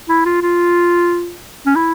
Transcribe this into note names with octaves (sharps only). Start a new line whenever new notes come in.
E4
F4
F4
C#4
E4